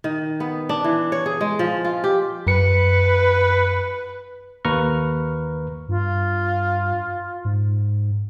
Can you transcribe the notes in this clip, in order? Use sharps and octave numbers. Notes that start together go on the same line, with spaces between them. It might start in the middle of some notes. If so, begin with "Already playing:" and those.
D#3
B3
D4
E3
C#5
G#4
G#3
F3
F4
G4
F#2 B4 C#7
D#2 A#3 B4 A#5 C#6 F6
G2 F4
G#2